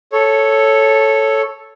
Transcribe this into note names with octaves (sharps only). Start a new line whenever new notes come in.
A4 C#5